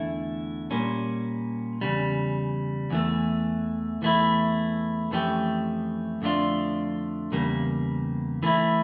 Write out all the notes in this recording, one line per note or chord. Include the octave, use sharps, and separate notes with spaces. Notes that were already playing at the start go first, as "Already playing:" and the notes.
Already playing: E2 D3 A3 E4 A4
A#2 G3 A#3 C#4
E2 C#3 G3
E2 E3 A3
E2 E3 A3 E4
F2 E3 A3 C#4 G4
F2 D3 A3 D4 F4
E2 C#3 G3 A#3
E3 A3 E4